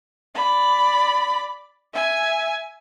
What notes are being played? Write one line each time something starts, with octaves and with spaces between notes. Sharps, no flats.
D5 B5
E5 G#5